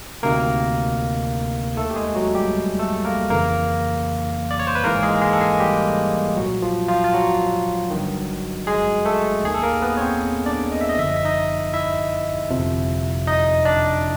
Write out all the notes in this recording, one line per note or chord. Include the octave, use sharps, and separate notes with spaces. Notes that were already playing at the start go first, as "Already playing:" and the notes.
D2 C3 D#3 A#3 A#4
D#2 D#3 A3 A4
G4
G#3 G#4
F#3 F#4
G3 G4
A3 A4
A#3 A#4
F2 C#3 E3 A#3 A#4
D5
C#5
C5
B4
G#1 G#2 E3 A#3 A#4
G#3 G#4
G#3 G#4
A4
G#3 G#4
G3 G4
B1 A#2 F3 F#3 F#4
F3 F4
F3 F4
F4
F#3 F#4
G1 G2 D#3
G#3 G#4
A3 A4
D#2 D#3 G#4
A4
A#3 A#4
B3 B4
C#5
C4 C5
D4 D5
D#5
E5
D#5
G1 F#2 D3 F3 E5
D#5
E5
D#4 D#5
E4 E5
G1 F2 C3 F3
D#4 D#5
D4 D5